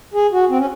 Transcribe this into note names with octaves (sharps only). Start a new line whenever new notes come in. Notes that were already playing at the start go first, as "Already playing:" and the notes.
G#4
F#4
C4
C#4